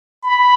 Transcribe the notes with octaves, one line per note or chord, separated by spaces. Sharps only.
B5